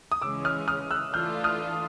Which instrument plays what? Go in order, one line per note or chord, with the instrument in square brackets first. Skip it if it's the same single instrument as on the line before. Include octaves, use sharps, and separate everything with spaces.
[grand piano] D#6
[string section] C#3 E3 G#3 C#4 [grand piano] D6 E6
[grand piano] D#6 F6
D#6 F6
E6 F#6
[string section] E3 A3 D4 F4 A4 [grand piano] F6 G6
[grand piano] D#6 F6